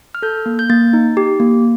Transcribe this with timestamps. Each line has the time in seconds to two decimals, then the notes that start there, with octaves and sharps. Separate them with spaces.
0.15 F6
0.22 A4 G6
0.46 A#3
0.59 G6
0.69 A#3 A6
0.93 D#4
1.17 G4
1.40 A#3